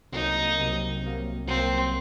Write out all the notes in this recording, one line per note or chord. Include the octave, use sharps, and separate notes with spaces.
C2 C3 F#3 A#3 D#4
C2 C3 F#3 A#3
C2 C3 F#3 A#3
C2 C3 F#3 A#3 C4